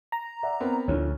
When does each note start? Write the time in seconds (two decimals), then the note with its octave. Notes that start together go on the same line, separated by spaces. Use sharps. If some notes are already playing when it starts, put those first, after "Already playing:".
0.12 A#5
0.43 D5 E5 F#5
0.60 B3 C4 A#4
0.88 D2 A2 D3 F3 C#4